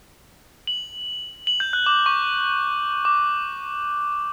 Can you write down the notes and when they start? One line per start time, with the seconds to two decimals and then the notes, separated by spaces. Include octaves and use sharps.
0.67 F#7
1.47 F#7
1.60 G6
1.73 F#6
1.86 D6
2.06 C#6
3.05 D6